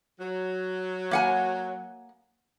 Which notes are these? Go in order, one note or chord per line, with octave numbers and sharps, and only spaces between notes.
F#3
A#3 F#5 G#5